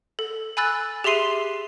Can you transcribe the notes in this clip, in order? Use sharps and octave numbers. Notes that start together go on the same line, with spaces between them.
A4
G#5 B5 E6 F#6 A6
G4 G#4 E5 C6 C7 D#7